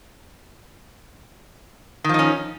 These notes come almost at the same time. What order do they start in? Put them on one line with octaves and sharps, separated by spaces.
D#3 F3 D#4 C#4